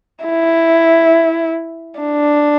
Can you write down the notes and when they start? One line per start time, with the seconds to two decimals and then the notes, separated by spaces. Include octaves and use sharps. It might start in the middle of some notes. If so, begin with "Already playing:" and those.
0.25 E4
1.99 D4